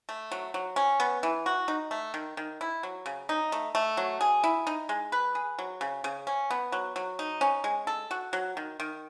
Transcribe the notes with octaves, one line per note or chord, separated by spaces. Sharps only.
A3
F#3
F#3
C#4
B3
E3
F#4
D#4
A3
D#3
D#3
E4
F#3
C#3
D#4
A3
A3
F#3
G#4
E4
D#4
G#3
B4
G#4
F#3
C#3
C#3
C#4
B3
F#3
F#3
D#4
C#4
G#3
A4
F#4
F#3
D#3
D#3